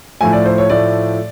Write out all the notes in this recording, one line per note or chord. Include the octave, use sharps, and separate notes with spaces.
A2 F3 A3 G#5
D5
C5
C#5
A2 F3 A3 D5